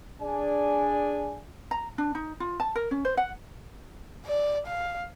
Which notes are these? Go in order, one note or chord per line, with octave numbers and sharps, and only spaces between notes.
D4 G#4 D5 G#5
A#5
D4
D#4
F4
A5
A#4
C#4
C5
F#5
D5
F5